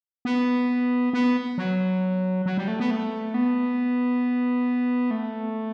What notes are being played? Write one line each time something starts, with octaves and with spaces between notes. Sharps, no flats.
B3
B3
F#3
F#3
G3
A3
B3
A3
B3
A3